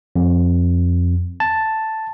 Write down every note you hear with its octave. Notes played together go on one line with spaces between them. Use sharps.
F2
A5